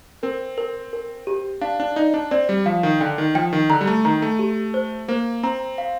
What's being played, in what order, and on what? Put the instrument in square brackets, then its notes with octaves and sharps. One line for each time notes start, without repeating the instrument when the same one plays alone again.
[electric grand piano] C4 [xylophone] A#4
[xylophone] A#4
A#4
G4
[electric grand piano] D4 [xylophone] F5
[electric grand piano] D4
[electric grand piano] D#4 [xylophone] D5
[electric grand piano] D4
[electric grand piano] C4 [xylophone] D5
[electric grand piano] G3
[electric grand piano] F3 [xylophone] F5
[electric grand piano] D#3
[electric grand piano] D3 [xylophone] G5
[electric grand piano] D#3
[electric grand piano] F3 [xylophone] G5
[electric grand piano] D#3
[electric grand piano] D3 [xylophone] A#5
[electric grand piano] G3
A3
[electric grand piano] D#3 [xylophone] A#5
[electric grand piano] A3
[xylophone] G4
C5
[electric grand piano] A#3 [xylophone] C5
[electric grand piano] C4 [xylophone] A#5
[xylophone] F5